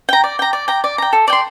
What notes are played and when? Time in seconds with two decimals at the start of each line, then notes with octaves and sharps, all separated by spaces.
0.09 G5 A#5
0.24 D5
0.39 G5 A#5
0.53 D5
0.68 G5 A#5
0.84 D5
0.98 G5 A#5
1.13 A4
1.28 D5 G5 C6